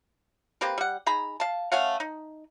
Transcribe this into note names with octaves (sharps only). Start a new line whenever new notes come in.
A#3 C4 G4 B4
G3 F#5
D#4 G#4 A#5 B5
F5 A5
A3 C#4 F5 F#5
D#4